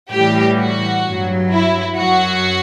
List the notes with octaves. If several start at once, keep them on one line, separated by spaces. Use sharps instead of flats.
A2 E3 G3 G4
F#4
G2 F#3
E4
F#2 F#3 F#4